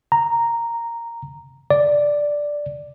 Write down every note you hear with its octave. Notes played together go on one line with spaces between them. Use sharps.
A#5
D5